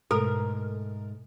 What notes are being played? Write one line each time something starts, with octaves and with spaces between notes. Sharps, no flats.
G#2 B2 A3 A4 A#4